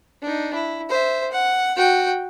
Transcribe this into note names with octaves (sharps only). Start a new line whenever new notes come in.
D4 D#4
E4
C5 E5
F#5
F#4 G5